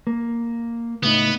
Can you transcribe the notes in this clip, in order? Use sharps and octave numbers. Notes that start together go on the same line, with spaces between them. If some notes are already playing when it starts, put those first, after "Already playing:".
A#3
C#2 A2 B3 D#4